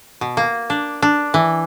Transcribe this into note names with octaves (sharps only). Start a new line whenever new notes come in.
B2
A#3
D4
D4
E3